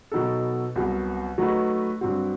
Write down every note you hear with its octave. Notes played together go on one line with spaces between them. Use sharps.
B2 F#3 B3 D#4 A4
C2 C3 F#3 B3 F#4
F#3 A3 D#4 F#4 B4
G2 F#3 C4 F#4